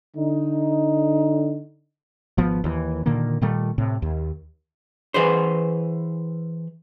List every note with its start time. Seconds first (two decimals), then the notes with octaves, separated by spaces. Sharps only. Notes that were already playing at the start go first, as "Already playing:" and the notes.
0.16 D3 D#4
2.38 G#1 F3 B3
2.64 D#2 E3
3.06 A#2 D3 D#3 A#3
3.41 A#2 D#3 G3 A3
3.78 A2 C3
4.02 D#2
5.14 E3 G#4 B4 C5